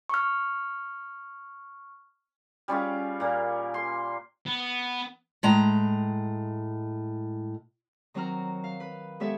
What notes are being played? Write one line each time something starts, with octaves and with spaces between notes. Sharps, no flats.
C#6 F6
G3 C#4 F4 G#4
A#2 A#3
C6
B3
A2 G#3 A#5
D#3 F#3 C4 F#4 A#5 F6
F5
B4
G#3 B3 G4 A4 C#5 E5